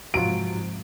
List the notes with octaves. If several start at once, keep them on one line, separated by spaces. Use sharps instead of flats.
G#2 C3 F3 F#3 F4 D7